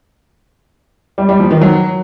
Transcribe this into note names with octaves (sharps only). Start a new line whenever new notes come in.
G3
G3
F3
D#3
F#3